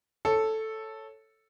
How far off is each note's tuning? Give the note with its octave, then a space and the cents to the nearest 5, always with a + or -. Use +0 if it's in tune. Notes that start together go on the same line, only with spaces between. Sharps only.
A4 +0 C#5 -5